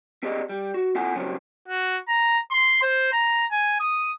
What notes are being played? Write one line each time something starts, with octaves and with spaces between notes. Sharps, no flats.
C4 G4 G#4 D5 D#5
G3
F#4
C4 E4 F4 A4 F#5 G#5
C#3 F#3 G3 C4 C#4
F#4
A#5
C6
C5
A#5
G#5
D#6